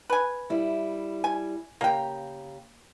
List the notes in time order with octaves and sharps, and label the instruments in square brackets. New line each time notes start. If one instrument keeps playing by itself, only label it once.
[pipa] B4 G#5
[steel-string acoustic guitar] G3 E4
[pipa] G#5
[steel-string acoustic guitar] C#3 G4 A#5 [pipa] A#3 G5